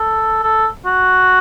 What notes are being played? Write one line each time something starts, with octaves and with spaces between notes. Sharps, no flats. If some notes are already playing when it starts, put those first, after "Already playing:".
Already playing: A4
A4
F#4